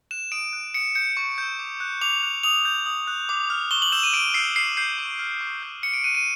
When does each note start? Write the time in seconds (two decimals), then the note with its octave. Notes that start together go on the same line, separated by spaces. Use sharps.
0.11 F#6 E7
0.32 D#6 D7
0.53 F#6
0.74 D#6 C#7
0.95 G6 C#7
1.17 C#6
1.38 E6 G6
1.59 D6
1.80 F#6
2.01 D6 F7
2.23 F#6
2.43 D#6 F7
2.65 G6
2.86 D#6
3.07 F#6
3.29 D6
3.50 F6
3.71 C#6 G7
3.82 F#7
3.92 E6 G6 E7
4.03 D#7
4.13 C#6 D7
4.34 E6 G6 C7
4.56 C#6 C7
4.77 E6 G6 C7
4.98 C#6
5.19 F6
5.41 C#6
5.62 E6 G6
5.83 D6 C#7
5.94 D7
6.04 F#6 D#7
6.15 D#7